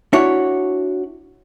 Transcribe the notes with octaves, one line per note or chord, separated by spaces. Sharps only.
D4 E4 F#4 C#5